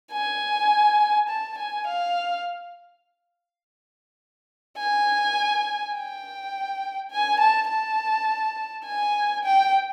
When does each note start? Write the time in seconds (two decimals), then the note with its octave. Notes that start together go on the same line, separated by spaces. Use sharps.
0.12 G#5
1.29 A5
1.58 G#5
1.88 F5
4.78 G#5
5.95 G5
7.11 G#5
7.40 A5
7.69 A5
8.85 G#5
9.45 G5